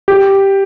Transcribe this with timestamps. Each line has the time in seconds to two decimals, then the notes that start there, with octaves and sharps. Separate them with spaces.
0.08 G4